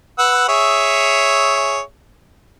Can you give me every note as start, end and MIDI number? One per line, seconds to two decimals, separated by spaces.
0.19 0.47 71
0.19 0.47 78
0.19 0.47 88
0.48 1.81 68
0.48 1.81 73
0.48 1.81 76